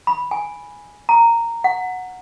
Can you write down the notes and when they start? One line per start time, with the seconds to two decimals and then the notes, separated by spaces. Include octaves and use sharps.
0.07 B5
0.31 G#5
1.09 A#5
1.64 F#5